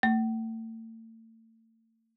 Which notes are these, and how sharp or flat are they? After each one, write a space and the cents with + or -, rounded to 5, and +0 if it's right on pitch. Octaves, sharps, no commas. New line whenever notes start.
A3 +40